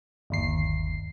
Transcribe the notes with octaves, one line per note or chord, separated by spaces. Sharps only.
G1 D#2 C7